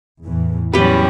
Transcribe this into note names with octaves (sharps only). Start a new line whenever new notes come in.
E2 A2 E3
E2 A2 F#3 G3 C#4 G4 B4